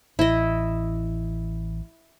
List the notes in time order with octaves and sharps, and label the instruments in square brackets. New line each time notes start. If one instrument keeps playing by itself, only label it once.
[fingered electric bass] A1 [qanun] E4 D#5